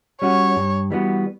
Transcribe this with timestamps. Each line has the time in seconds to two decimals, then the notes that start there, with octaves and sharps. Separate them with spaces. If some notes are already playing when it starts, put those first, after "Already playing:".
0.22 G3 C#4 F#4 C#5
0.56 G2
0.91 E3 G3 B3 F#4